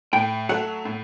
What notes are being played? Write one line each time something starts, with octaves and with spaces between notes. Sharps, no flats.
A2 G5
F#3 A3 F#5
A2